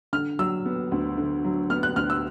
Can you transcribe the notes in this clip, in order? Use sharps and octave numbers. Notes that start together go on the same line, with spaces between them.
D3 F6
F#3 E6
B3
D2
D3
F#3
B3 F6
F#6
D2 F6
E6